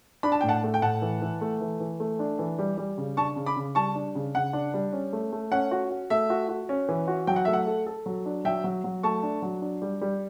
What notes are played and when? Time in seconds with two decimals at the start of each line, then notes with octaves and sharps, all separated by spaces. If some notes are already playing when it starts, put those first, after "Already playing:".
0.23 D4 B5
0.32 A5
0.41 A2 G5
0.49 F#5 A5
0.64 A3
0.74 G5
0.82 A2 F#5 A5
1.02 E3
1.22 E3
1.41 A3
1.61 E3
1.80 E3
2.00 A3
2.19 D4
2.39 E3
2.59 G3
2.78 G3
2.98 C#3
3.17 D4 A5 C#6
3.36 C#3
3.46 B5 D6
3.57 C#3
3.75 G3 A5 C#6
3.95 D4
4.15 C#3
4.35 C#3 F#5
4.53 D4
4.74 G3
4.93 C#4
5.13 A3
5.32 A3
5.52 C#4 F#5
5.71 F#4
5.91 F#4
6.10 A3 E5
6.30 F#4
6.49 F#4
6.69 C#4
6.89 E3
7.08 F#4
7.27 F#3 G5
7.36 F#5
7.45 A3 E5
7.53 F#5
7.67 A4
7.87 A4
8.06 F#3
8.26 D4
8.45 F#3 E5 G5
8.64 F#3
8.84 F#3
9.03 A3 A5 C#6
9.23 D4
9.42 F#3
9.62 D4
9.82 G3
10.01 G3